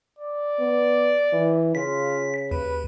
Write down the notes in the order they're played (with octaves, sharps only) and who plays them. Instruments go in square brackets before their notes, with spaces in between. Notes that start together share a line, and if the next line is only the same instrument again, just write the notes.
[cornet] D5
[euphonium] B3
E3
[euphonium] C#3 [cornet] F4 [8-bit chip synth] B6
[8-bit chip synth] D#2 [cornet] B4